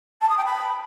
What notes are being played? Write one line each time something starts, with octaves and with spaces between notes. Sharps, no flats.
A5
D#6
G5
B5